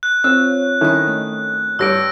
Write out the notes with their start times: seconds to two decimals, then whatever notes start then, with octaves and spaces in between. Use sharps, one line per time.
0.03 F#6
0.24 C4 F4 C#5 E6 F#6
0.81 D#3 C#4 E4 A4 D#5
1.08 A3
1.79 G2 G3 C#5 E6 A#6 D7